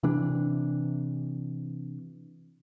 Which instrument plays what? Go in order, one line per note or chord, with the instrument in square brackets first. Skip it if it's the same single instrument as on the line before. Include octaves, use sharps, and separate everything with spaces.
[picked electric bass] C3 E3 D4